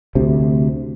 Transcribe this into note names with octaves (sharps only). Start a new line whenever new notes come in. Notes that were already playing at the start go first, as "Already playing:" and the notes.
D2 C3